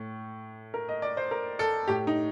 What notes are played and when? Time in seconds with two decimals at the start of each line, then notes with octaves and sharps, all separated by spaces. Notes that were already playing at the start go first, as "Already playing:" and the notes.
Already playing: A2
0.74 A#4
0.89 D#5
1.02 D5
1.17 C5
1.31 A#4
1.59 A4
1.88 A2 G4
2.07 D#4